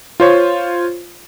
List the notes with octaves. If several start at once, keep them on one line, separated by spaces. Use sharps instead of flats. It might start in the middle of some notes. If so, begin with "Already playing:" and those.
F4 C5 C#5